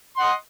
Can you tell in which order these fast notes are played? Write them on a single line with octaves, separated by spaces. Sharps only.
C6 F#5 D#5